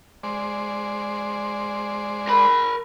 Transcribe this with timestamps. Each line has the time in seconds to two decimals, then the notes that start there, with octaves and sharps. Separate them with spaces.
0.23 G#3 C5 D5
2.27 A#4 B5